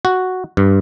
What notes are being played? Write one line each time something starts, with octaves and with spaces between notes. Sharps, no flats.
F#4
G2